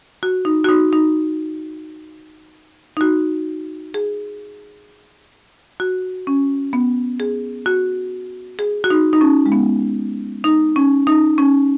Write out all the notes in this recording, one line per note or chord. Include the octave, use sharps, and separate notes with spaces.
F#4
D#4
F#4
D#4
D#4
D#4
F#4
G#4
F#4
C#4
B3
G#4
F#4
G#4
F#4
D#4
D#4
C#4
G#3
B3
D#4
C#4
D#4
C#4